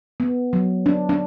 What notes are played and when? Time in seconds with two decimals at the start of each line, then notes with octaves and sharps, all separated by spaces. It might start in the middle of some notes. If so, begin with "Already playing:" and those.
0.20 B3
0.53 F#3
0.86 D4
1.09 D4